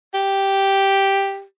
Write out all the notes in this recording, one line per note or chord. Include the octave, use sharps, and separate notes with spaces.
G4